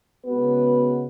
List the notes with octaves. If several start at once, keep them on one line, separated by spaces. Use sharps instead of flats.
C#3 G#3 B3 F#4 B4